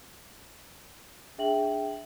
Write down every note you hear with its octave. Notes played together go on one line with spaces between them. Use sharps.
D4 G#4 E5 G5 F#7